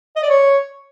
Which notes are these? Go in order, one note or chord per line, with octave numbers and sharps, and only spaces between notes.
D#5
D5
C#5